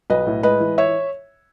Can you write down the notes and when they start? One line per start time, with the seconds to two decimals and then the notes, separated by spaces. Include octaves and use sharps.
0.10 B1 B4 D#5
0.26 A2
0.43 G#3 B4 D#5
0.60 E3
0.78 C#5 E5